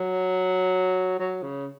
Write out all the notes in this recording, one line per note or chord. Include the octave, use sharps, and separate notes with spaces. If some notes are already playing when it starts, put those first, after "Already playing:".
Already playing: F#3
F#3
C#3